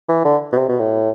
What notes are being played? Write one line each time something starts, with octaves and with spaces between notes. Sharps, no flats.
E3
D3
B2
C3
B2
A2